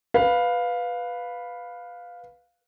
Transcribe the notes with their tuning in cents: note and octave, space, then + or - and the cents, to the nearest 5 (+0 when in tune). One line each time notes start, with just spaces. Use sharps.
B4 +0 F5 +10